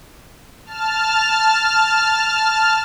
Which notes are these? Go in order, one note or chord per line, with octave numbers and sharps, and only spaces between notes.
A5 F6